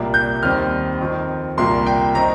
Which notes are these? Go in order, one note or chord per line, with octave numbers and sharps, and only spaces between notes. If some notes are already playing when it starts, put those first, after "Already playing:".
Already playing: C2 A#2 G3 A#3
G6
D#2 D#3 G3 C4 F6
F2 D#3 C4
C2 A#2 G3 A#3 C6
G5
D#3 C4 D#4 A#5